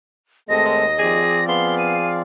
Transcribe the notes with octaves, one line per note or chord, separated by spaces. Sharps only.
D#2 G#3 A3 C4 A4 D#5 A#6
G#3
F3 C4 G#4 D5
B3 G#4 F5 C6
D#7